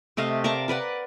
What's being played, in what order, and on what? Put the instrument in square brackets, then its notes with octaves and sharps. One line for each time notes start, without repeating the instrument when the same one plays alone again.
[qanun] C3 A3 D#5 F5
A#4 D5 A5 A#5
A#4 B4 D5 F#5